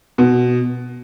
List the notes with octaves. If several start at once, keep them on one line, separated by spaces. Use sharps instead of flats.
B2